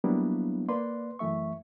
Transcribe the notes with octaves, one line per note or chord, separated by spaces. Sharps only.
F#3 G3 A#3 B3 D4 E4
A#3 B4 D5 C6
F#2 E3 A3 E5 C#6